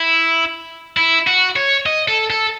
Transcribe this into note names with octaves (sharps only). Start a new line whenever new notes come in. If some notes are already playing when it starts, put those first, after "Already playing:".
Already playing: E4
E4
F#4
C#5
D#5
A4
A4